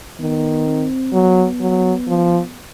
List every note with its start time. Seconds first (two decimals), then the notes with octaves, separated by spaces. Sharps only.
0.20 D#3 B3
0.66 C4
1.13 F#3 B3
1.60 F#3
2.08 F3